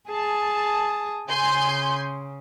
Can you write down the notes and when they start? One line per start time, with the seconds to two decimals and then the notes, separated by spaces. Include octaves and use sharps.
0.10 G#4 A5
1.30 C#3 G#5 C6 G6